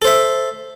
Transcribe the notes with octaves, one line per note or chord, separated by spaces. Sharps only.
A4 C5 E5